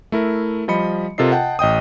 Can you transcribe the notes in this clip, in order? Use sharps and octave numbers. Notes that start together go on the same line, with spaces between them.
A3 E4 A#4
F3 G3 D#5 B5 C#7
C3 F4 A4 A#4 D#5 C7
D#5 F#5 G5 A5
A1 D#5 G5 D#6